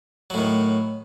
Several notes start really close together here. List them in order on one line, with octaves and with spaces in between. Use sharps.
F#3 A2 D#3